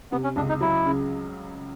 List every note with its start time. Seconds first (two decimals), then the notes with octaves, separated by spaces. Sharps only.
0.12 C3 B3
0.24 C#4
0.36 C#2 D4
0.49 D#4
0.61 F#3 E4
0.86 C#3